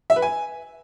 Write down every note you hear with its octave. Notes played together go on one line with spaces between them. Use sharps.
E5
B4
G#5